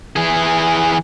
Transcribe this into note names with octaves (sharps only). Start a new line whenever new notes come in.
E3 G#4